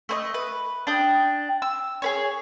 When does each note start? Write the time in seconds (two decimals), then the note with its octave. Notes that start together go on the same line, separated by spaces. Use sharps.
0.09 A3 C5 D#5
0.34 B4
0.87 D4 G5 D#6
1.62 E6
2.02 G#4 B4 C#5